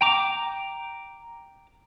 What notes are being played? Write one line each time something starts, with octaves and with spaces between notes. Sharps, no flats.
G5 A#5 D6